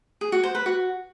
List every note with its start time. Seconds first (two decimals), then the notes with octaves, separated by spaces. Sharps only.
0.21 G#4
0.32 F#4
0.43 C5
0.55 B4
0.66 F#4